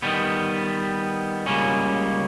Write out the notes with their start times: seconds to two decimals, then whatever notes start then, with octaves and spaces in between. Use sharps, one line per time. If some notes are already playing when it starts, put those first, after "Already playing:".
0.02 D#3 G3 B3
1.46 C#2 C#3 G3 A#3 C#4